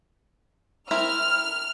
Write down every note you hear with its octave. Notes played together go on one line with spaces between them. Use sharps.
C4 E4 A#4 F6